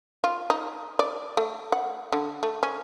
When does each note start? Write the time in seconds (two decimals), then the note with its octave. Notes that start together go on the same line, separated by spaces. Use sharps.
0.24 F4
0.50 D#4
0.99 D5
1.37 A3
1.72 F#5
2.12 D3
2.43 A3
2.63 C#4